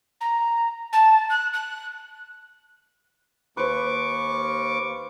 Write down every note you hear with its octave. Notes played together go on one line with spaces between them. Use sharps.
A#5
A5
F#6
F#6
D#2 B4 C5 C#6 D6